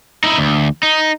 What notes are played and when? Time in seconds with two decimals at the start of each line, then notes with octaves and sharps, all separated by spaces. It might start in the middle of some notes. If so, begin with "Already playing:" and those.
0.24 D#4 E4
0.38 D2
0.83 D#4